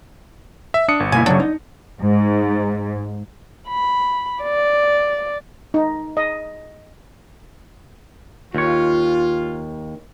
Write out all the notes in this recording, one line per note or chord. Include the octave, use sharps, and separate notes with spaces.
E5
D4 D#6 C#7
G1
B2 A#3 E4 G#5
C#3 F#3 D4 C#5
D#4
G#2
B5
D5
D#4
D#5
D#2 F4 C#5